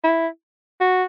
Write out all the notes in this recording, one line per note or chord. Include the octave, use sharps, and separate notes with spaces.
E4
F#4